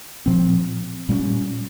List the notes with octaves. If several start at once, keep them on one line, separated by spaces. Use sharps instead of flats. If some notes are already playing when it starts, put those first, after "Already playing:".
A#2 F3 C4
A#2 G3 A#3 C#4